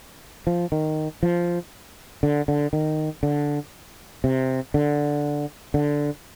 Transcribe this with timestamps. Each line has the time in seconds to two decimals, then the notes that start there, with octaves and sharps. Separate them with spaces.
0.47 F3
0.72 D#3
1.23 F3
2.23 D3
2.48 D3
2.73 D#3
3.23 D3
4.24 C3
4.74 D3
5.74 D3